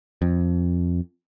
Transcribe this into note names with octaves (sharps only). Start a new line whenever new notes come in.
F2